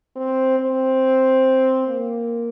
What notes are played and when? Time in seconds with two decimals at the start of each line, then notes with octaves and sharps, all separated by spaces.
0.16 C4
0.59 C4
1.87 A#3